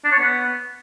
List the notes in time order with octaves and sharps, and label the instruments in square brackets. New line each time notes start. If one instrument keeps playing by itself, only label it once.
[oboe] D4
C#5
B3